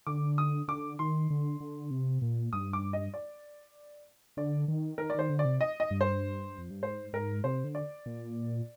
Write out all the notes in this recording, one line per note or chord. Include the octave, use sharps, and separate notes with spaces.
D3 D6
D#6
D3 D6
D#3 C6
D3
D3
C3
A#2
G2 D#6
D6
D#5
D5
D3 D5
D#3
D#3 A#4
D5
D#3 C5
D3
D5
C3
D#5
D#5
G2
C5
F2
G2
G#2 C5
G#2 A#4
C3 C5
D3
D5
A#2